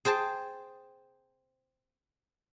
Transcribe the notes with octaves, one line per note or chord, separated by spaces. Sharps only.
G#4 C5 G5 A5